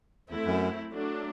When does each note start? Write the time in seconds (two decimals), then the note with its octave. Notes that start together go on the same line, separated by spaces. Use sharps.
0.30 E2 A3 C4 E4
0.45 F#2
0.93 F#3 A3 D4